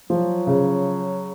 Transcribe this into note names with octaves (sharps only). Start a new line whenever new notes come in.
F3 F#3
C#3